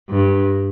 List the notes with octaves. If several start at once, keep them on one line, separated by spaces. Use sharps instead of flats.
G2